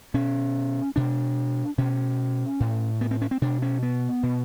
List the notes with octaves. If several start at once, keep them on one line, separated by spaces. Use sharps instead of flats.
B2 C#4
B2 D4
B2 C#4
A2
B3
C4
C#4
C4
B2 D4
C#4
B3
B2